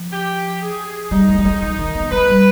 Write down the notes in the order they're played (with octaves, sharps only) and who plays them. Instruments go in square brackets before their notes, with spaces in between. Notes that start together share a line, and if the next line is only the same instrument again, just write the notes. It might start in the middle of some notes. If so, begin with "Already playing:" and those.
Already playing: [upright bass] F3
[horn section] G4
G#4
[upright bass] G3 [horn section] D#4
[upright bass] G#3
G3
G#3
F3
D#3
B3
[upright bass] G#3 [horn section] B4
[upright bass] G3